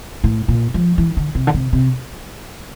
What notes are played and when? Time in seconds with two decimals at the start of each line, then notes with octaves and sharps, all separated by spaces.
0.24 A2
0.48 A#2
0.74 F3
0.98 E3
1.17 D3
1.35 C3
1.47 D3
1.54 C3
1.73 C3